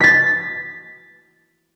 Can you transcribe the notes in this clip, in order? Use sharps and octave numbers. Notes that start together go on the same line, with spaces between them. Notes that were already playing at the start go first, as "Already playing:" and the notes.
A6 B6